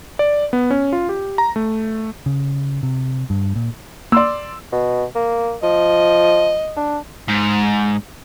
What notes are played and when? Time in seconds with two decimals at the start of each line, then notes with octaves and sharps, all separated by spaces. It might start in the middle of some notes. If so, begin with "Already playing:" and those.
0.19 D5
0.53 B3
0.71 C#4
0.93 F4
1.09 G4
1.38 A#5
1.56 A3
2.26 C#3
2.83 C3
3.30 G2
3.56 A#2
4.12 A#3 D5 C6 E6
4.72 B2
5.15 A#3
5.63 F3 D#5
6.76 D4
7.28 G#2